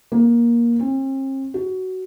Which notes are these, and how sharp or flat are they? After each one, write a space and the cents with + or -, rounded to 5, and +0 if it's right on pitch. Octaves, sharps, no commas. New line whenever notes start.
A#3 +15
C4 +45
F#4 +15